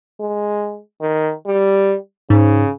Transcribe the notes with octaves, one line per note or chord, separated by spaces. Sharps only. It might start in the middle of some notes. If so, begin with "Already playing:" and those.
G#3
D#3
G3
G#2 C#3